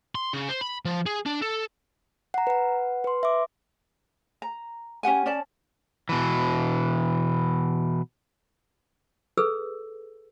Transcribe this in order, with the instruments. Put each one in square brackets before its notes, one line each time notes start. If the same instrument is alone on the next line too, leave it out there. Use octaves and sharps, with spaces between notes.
[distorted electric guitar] C6
C#3
C5
B5
F3
G#4
D4
A4
[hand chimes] F#5 A#5
B4 F#5
B4 C6
E5 D6
[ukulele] A#5
C#4 G4 F#5 G#5
C#4 D5 A5
[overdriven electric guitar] B2 E3
[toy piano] G#4 A4 B4 E6